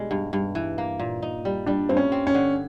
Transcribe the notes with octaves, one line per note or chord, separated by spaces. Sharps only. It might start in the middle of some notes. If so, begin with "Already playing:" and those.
Already playing: B2 G3 G#3 D4
G2
G2
E3
A#3
A#2
D#4
G3
G3 D4
G2 C4
C#4
C4
C#4
D3